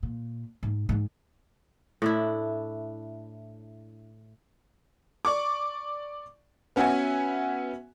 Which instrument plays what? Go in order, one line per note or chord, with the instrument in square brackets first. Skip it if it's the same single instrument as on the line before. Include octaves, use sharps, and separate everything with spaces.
[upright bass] A#2
G#2
G#2 G#3
[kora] A2 D4 E4
[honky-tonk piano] D5 C#6 D6
B3 C#4 F#4 E5 F#5 G#5